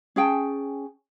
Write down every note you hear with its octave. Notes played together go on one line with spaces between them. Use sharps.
C#4 G#4 G5 A5